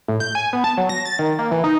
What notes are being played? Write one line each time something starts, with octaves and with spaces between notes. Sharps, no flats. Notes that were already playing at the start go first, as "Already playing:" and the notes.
A2
G6
G#5
B3
A5
F#3
A#6
A6
D#3
A#3
E3
D#4